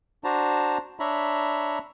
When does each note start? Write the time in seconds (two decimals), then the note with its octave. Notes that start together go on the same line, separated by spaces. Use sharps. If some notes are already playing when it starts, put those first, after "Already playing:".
0.24 D4 F#4 C5 A5 A#5
1.00 D4 C#5 E5 A#5 B5